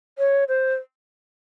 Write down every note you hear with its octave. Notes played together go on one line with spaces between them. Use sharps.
C#5
C5